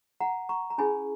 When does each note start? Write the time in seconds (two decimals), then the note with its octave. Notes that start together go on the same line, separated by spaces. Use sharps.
0.20 F#5 A#5
0.49 A#5 C#6
0.70 A#5
0.78 C#4 E4 G#4 G#5 B5